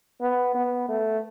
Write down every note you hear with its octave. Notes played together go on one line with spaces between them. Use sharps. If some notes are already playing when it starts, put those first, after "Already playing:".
B3
B3
A3